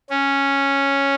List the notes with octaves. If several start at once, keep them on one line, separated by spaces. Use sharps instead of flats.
C#4